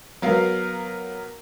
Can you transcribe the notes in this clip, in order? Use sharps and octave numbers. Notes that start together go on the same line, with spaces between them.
F#3 B3 A#4 F5